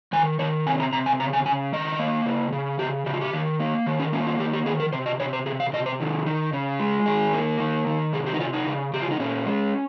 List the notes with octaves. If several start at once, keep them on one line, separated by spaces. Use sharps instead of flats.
D#3 G#5
D#3 C#5
C3 G#5
A#5
C3 A#5
G#5
C#3 A#5
G#5
C#3 G#5
D#3 D#5
A#3
C#3
C#3
C#3 G4
C#3 G4
F4
G4
D#3
A#3
D#3
C#4
A#3 C#4
F4
D#3 G4
G4
D#3 G#4
A#4
C3 C5
D#5
C3 C#5
C5
C3 G#4
F5
C3 D#5
C5
D#3
D#3
C#3
G#3
D#3 G#4
A#3
D#3
D#3
C3 G#4
G4
D#4
C3 F4
D#4
C#3
C#3 G4
F4
D#4
A#2 C#4
G#3